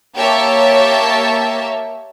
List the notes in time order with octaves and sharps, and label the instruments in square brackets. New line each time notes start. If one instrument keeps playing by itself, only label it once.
[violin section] A#3 G4 C#5 E5 A5